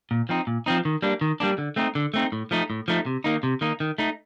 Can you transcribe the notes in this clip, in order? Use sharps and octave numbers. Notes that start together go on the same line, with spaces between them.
A#2
F3 C4 D#4
A#2
F3 C4 D#4
D#3
G3 A#3 D4
D#3
G3 A#3 D4
D3
A3 C4 D#4
D3
A3 C4 D#4
A2
F3 A3 D#4
A2
F3 A3 D#4
C3
D#3 A#3 D#4
C3
D#3 A#3 D#4
D#3
A3 D#4